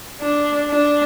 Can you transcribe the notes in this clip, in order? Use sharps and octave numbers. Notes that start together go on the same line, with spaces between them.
D4
D4